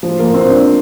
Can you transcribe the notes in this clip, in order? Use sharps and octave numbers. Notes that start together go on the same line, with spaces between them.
F3
A#3
C4
D4